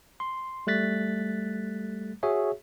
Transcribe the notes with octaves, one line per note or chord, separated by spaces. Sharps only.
C6
G3 A3 F#6 A6 B6
F#4 G#4 C#5 E5